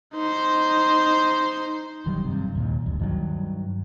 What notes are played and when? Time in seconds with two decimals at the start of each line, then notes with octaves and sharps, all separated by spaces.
0.14 D#4 C5
2.06 D#1 D#3 F#3 G3
2.24 G2 C3
2.55 D#2 A#2
2.86 D1 D2 G2
2.99 G2 D#3 E3 F#3